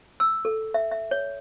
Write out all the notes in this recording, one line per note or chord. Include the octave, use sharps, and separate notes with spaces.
E6
A4
E5
E5
C#5